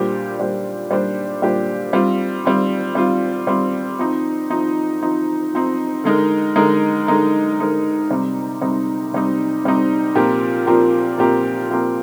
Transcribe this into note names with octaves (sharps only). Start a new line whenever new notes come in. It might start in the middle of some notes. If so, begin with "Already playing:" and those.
Already playing: A#2 G3 D4 G4 C5
A#2 G3 D4 G4 C5
A#2 G3 D4 G4 C5
A#2 G3 D4 G4 C5
G3 C4 F4
G3 C4 F4
G3 C4 F4
G3 C4 F4
F3 C4 D#4
F3 C4 D#4
F3 C4 D#4
F3 C4 D#4
D3 G#3 D#4 A#4
D3 G#3 D#4 A#4
D3 G#3 D#4 A#4
D3 G#3 D#4 A#4
C3 G3 C4 D#4
C3 G3 C4 D#4
C3 G3 C4 D#4
C3 G3 C4 D#4
A#2 F3 C4 G4 A#4
A#2 F3 C4 G4 A#4
A#2 F3 C4 G4 A#4
A#2 F3 C4 G4 A#4